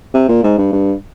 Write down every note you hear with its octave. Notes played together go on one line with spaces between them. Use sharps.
C3
A#2
G#2
G2
G2